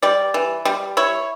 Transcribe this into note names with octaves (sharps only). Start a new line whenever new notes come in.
G3 D5
E3
G3
E4 C#5